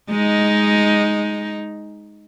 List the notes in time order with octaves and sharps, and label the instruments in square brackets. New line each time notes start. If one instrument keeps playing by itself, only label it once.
[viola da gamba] G#3 D#4